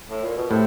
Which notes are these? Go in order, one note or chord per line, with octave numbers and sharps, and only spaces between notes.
A2
A#2
B2
A2 C3